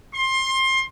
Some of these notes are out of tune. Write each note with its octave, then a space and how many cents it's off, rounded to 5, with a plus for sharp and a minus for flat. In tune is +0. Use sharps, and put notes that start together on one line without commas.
C6 +25